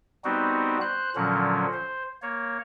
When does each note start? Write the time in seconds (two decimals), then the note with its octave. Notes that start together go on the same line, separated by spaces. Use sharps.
0.24 G3 B3 C4 D#4 F#4
0.81 C5 F#6
1.16 A#2 D3 F3 F#3 C#4
1.73 C5
2.22 A#3 C#5